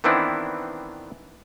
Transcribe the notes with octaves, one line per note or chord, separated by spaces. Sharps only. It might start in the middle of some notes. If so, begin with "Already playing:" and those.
D#3 E3 B3 C4 D4 E4